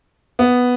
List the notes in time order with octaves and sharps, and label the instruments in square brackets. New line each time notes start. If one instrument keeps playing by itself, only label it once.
[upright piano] B3